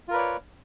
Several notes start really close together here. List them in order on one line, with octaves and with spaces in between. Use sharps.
F4 A#4 B4 D5 C#5